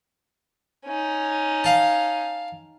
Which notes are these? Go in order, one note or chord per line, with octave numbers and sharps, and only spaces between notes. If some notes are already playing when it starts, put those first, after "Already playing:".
C#4 D#4
F5 A5